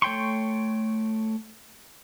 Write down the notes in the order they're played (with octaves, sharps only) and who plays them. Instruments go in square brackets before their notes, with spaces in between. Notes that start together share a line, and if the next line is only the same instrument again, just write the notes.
[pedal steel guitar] A3 C#5 G5 C6 C#6